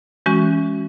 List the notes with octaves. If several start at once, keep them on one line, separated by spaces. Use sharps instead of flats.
E3 G#3 C#4 F#4